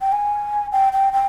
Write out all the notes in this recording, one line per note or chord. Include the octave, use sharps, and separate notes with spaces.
G5
G#5
G5
G5
G5